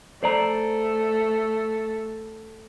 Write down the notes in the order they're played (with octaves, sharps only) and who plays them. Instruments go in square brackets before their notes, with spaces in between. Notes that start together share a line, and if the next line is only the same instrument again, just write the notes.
[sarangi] A3 [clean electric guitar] C5 D5 A#5